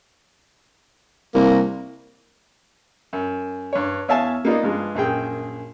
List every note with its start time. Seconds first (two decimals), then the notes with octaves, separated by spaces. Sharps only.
1.34 C2 A#3
3.13 F#2
3.73 G2 C#5
4.08 E2 C#5 E5 F5 G#5 A5
4.45 A#3 B3 D#4 F4 D5
4.63 G2 F3 G#3
4.95 A#1 F#2 G#4 G5